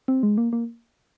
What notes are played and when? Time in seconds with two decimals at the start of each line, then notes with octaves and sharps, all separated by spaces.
0.08 C4
0.23 G#3
0.38 A#3
0.53 A#3